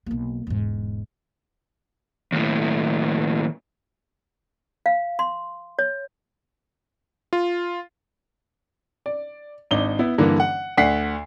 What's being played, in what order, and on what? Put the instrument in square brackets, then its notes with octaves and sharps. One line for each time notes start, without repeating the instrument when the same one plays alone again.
[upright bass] B1 A#3
E1 G#2
[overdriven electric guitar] D#2 A2
[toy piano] F5
C6
C#5
[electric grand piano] F4
[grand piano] D5
G#1 D4 D#4 G7
B3 E4
G2 D3 E3 A#3
F#5
D2 D5 F#5 B6 C7